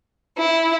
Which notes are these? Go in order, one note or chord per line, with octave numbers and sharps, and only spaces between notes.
E4